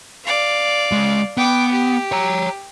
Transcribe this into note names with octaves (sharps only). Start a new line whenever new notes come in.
D5 F5
C#2 G#3
B3 G5 D6
G4
C#5 A#5